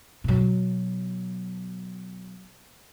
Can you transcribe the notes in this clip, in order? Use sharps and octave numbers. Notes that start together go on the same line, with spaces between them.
B2 F#3